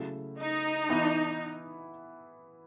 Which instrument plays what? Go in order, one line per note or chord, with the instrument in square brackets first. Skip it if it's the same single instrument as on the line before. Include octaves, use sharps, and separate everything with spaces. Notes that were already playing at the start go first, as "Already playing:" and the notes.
Already playing: [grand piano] C#3 F#3 A3 E4
[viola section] D#4
[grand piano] E3 B3 E4